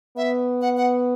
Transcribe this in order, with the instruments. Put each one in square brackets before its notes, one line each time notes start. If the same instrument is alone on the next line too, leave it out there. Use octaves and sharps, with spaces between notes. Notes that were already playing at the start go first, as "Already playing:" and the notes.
[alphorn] B3 [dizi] E5
[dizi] F#5
F#5